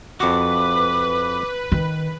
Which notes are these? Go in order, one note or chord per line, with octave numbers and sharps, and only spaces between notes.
F2 F#4 B4 D6
D#3